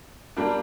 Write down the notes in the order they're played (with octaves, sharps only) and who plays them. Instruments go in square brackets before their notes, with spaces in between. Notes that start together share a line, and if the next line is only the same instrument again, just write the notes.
[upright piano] G3 A#3 D4